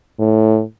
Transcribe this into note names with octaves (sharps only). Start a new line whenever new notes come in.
A2